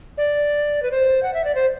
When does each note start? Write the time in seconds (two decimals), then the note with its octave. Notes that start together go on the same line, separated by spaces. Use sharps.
0.18 D5
0.83 B4
0.91 C5
1.23 F#5
1.34 E5
1.44 D5
1.55 C5